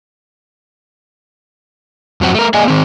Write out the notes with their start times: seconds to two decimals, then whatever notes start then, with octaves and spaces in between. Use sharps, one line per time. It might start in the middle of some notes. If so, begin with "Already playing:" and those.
2.21 F2 F#3 C4 F#4
2.34 A3 A#4
2.54 A#3 G#4 D5 D#5 F5 G#5
2.68 D#3 C4